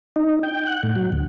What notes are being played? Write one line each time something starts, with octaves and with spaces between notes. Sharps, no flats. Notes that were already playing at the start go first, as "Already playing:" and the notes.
D#4
G5
F#5
A2
F#3
D2